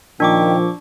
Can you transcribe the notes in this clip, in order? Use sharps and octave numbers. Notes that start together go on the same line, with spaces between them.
A#2 D#3 F3 D4 G5 C#6 D6